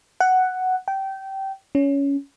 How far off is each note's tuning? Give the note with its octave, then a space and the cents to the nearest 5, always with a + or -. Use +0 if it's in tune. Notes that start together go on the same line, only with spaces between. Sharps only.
F#5 +5
G5 -20
C#4 +15